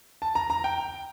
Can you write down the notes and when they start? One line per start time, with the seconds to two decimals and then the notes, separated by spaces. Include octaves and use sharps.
0.22 A5
0.35 A#5
0.50 A#5
0.64 G5